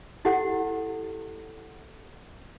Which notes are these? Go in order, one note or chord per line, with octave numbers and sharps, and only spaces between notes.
E4 G4 A4 F#5